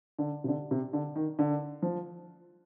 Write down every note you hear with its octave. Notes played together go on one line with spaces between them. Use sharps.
D3
C3
D3
C3
D3
D#3
D3
F3